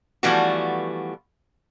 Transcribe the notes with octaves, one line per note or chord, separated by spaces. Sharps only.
E3 F3 G3 A3 B3 F#4